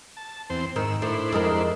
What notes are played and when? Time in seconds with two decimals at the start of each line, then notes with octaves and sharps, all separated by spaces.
0.17 A5
0.50 E2 C4 C5
0.76 G#2 D#3 E6
1.02 A2 D4 E4 C5
1.32 F2 G#3 A#4